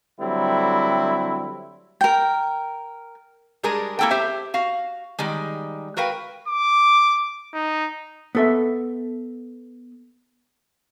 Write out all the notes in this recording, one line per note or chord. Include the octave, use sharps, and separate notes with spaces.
D3 F#3 G3 A3 C4 E4
A#4 G5
G3 G#3 D4 G#4 A#4
A#3 E4 A4 F#5 G5
G4 C5 E5
F#4 F5
D#3 G3 G#3
F#4 A#4 B4 F5 G5
D6
D#4
B3 A4 E5